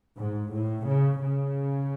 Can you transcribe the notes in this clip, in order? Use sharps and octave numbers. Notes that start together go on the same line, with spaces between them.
G#2
A2
C#3
C#3